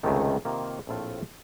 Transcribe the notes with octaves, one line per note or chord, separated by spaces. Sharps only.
C#2 C3 D#3 A3
C3 D#3 A#3 F4
A#1 A2 A3 C4 F4